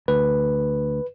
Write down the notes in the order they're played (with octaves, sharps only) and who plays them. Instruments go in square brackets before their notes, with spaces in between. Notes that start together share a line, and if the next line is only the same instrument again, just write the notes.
[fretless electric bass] D2 [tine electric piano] B4